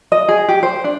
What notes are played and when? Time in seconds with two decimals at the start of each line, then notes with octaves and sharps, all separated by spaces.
0.12 D#5
0.28 G#4
0.49 G4
0.63 C5
0.84 D4